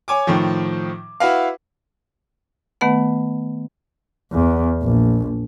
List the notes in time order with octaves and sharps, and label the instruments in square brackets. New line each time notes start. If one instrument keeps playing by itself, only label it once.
[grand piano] C#5 G#5 D6
A2 D#3 F3
E4 F#4 B4 F5
[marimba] D#3 A3 B3 B4 F#5
[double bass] E2
A#1